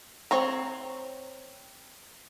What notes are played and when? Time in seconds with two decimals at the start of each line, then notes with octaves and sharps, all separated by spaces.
0.31 C4 C#5 A#5